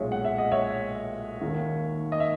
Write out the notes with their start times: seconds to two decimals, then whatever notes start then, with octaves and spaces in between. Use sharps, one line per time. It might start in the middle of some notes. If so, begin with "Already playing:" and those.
Already playing: B1 A#2 G#3 C#5 E5
0.12 F#5
0.25 E5
0.38 D#5
0.52 C#5 E5
1.41 D#2 D#3 A#3
2.12 D#5
2.20 E5